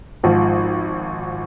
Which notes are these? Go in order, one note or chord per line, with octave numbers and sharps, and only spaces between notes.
G#1 G#2 F3